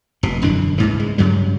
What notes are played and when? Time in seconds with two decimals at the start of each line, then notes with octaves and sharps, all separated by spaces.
0.23 F1 B2
0.42 E1 F#2 D3 D4
0.78 C#2 G#2 E3
1.00 G#3
1.18 G2 C#3 F#3 G3